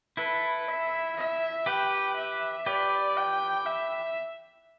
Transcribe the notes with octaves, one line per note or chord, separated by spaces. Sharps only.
E4 A4 B4
E5
E5
G4 B4 G5
E5
G4 B4 D5
G5
E5